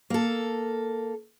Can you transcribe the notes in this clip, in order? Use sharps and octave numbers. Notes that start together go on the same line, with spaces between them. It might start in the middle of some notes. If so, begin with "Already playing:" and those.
A#3 A4